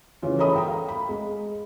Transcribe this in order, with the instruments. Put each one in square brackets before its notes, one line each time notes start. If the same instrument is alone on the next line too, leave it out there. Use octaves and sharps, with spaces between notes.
[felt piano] C#3 E3 C#4 F4
A4 A#4 C#5 E5 B5 D#6
A4 G5 A#5
F5
B5
G#3